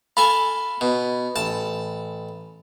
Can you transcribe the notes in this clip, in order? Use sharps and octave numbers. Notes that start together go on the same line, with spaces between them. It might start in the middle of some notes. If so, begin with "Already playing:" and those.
F4 A4 G#5 B5
B2
A1 A5